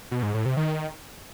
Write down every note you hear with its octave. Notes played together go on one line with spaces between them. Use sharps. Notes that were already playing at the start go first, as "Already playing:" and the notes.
B2
G#2
A2
C3
D#3